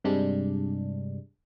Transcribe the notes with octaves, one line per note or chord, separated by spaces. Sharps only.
G2 C3 G3 G#3 D4